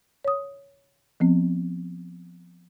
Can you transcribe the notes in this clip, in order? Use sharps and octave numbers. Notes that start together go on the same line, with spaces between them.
C#5 D#6
F3 B3 C4